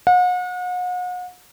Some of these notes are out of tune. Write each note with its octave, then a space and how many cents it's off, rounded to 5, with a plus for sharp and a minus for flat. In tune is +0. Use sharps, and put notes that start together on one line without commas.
F#5 -40